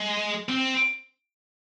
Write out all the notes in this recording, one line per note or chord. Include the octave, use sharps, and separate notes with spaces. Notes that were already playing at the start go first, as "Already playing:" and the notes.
Already playing: G#3
C4